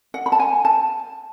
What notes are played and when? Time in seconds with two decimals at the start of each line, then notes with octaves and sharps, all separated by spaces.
0.14 F#5
0.26 B5
0.32 A5
0.40 G#5
0.65 A5